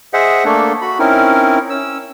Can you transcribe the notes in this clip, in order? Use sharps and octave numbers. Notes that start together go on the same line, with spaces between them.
G#4 C5 D#5 E5 F#5
A3 A#3 D4 A4
F#4 B5
C4 C#4 D#4 E4 A#4
C#4 E6